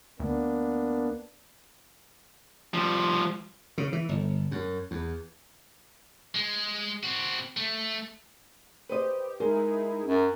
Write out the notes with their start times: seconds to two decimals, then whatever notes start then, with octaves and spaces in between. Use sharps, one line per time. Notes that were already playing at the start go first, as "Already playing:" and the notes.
0.20 D2 A#3 B3 D4
2.74 F3 G3
3.78 C#3
3.93 E3
4.09 G1
4.51 F#2
4.91 E2
6.35 G#3
7.03 C4 F#4
7.57 A3
8.89 G4 B4 C5 D#5
9.40 G#3 D#4 E4 G#4 A#4
10.04 F#2